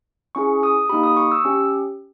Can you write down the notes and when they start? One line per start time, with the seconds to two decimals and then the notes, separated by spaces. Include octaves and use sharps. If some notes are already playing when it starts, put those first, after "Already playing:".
0.35 C#4 E4 G#4 C#6
0.63 D#6
0.89 A#3 D#4 G4 B5
1.03 D#6
1.17 C#6
1.32 E6
1.45 C#4 G4